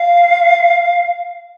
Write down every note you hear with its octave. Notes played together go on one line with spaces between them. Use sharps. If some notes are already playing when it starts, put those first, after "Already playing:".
Already playing: F5